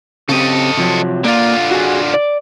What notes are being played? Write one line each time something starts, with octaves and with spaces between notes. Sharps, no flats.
C#3 C4 G4 A4 D#5
C3 F3 F#3
D3 A#3 F4 D5
F#4 G#4
D5